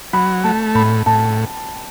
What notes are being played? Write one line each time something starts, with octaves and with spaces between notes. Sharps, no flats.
F#3 B5
A3 A5
A2 B5
A2 A5